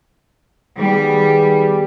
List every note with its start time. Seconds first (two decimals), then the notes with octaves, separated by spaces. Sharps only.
0.79 D#3 G3 B3 G#4